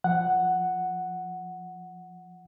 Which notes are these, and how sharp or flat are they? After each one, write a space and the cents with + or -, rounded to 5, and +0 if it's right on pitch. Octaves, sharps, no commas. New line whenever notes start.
F3 -5 F#5 +0